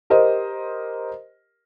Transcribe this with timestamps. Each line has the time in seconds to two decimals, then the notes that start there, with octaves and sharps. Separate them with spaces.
0.10 G4 A#4 C5 D#5